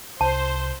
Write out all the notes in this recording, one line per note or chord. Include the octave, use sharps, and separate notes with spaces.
C2 C5 A5